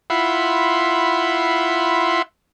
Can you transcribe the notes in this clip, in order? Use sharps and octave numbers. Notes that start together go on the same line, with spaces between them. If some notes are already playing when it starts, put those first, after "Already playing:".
E4 F4 E5 F#5 B5 C6